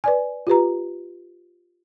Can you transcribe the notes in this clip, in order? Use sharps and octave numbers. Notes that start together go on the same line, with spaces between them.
B4 D5 G#5
F4 G4 B4 A#5